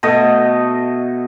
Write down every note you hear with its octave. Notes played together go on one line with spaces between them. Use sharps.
B2 A3 D#5